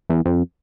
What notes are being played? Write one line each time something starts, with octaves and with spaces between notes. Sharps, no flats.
E2
F2